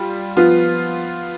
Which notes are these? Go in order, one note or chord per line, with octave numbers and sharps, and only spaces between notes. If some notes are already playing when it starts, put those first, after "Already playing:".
Already playing: G3 F4
F3 B3 F4